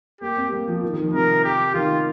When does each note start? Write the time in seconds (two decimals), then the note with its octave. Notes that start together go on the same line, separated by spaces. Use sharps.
0.21 A#3 G4
0.37 C4
0.52 A#3
0.68 F3
0.83 D#3
0.93 D#3
1.03 F3
1.13 C3 A#4
1.44 G4
1.74 D#3 F4